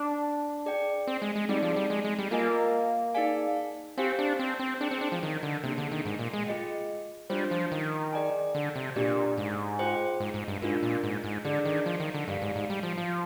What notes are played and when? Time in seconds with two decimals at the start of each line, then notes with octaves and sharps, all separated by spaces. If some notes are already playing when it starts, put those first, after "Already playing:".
Already playing: D4
0.66 G#4 D5 G5
1.07 C4
1.22 G#3
1.36 G#3
1.49 G3 C4 D#4 G#4 D5
1.63 F3
1.76 G3
1.90 G#3
2.04 G#3
2.19 G3
2.31 A#3 F4 A#4 D#5 G#5
3.14 D#4 G#4 D5 F5 G#5
3.98 C4 G4 C5 F5 G#5
4.19 D4
4.39 C4
4.59 C4
4.81 D4 G#4 C5 G5
4.91 C4
5.01 D4
5.12 F3
5.23 D#3
5.43 D3
5.64 C3 A#3 D4 G#4
5.78 D3
5.92 D#3
6.05 G#2
6.19 A#2
6.34 G#3
6.46 F4 G#4 D#5 G5
7.29 G3 D4 F4 C5
7.51 F3
7.72 D#3
8.13 G#4 D5 G#5
8.55 D3
8.75 C3
8.96 A#2 D4 G4 D5
9.38 G#2
9.79 F4 G#4 C5 G5
10.20 G#2
10.34 G#2
10.48 G2
10.62 G#2 D4 F4 A#4
10.83 A#2
11.03 G#2
11.24 G#2
11.45 D3 D4 G#4 D5
11.66 D#3
11.86 F3
12.00 D#3
12.14 D3
12.28 G2 G4 D5 F5
12.42 G#2
12.56 G#2
12.70 G3
12.83 F3
12.97 F3